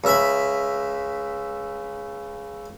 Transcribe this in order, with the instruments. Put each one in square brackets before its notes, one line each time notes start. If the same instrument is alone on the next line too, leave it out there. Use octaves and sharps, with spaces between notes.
[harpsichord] C#2 E5 B5